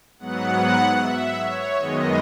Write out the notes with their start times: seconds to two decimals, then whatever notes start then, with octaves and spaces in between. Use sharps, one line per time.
0.19 G#2 F#3 B3 F#5
1.00 E5
1.39 C#5
1.79 F#2 D#3 G#3 B3 D#5